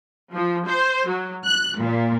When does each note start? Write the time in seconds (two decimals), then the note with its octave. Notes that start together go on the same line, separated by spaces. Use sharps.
0.33 F3
0.67 C5
1.08 F#3
1.45 F#6
1.79 A#2